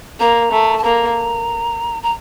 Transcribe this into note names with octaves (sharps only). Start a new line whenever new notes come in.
A#3 A#5
A3
A5
A#3 A#5
A#5